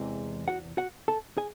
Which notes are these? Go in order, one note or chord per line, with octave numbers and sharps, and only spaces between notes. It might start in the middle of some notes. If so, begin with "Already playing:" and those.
Already playing: E2 C3 E3 G#3
F#4 F#5
F#4 F#5
A4 A5
G#4 G#5